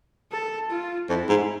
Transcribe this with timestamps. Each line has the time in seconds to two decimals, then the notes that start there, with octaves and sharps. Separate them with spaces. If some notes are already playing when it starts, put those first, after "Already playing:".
0.32 A4
0.71 F4
1.09 F2 E4
1.29 G#2